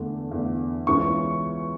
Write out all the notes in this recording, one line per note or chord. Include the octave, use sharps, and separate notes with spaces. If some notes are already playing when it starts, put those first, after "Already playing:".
Already playing: E2 D3 A3
E2 D3 A3
C#2 C#3 E3 B3 C#6